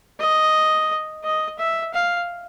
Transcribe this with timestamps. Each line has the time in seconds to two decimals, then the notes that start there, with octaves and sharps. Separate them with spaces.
0.20 D#5
1.24 D#5
1.59 E5
1.94 F5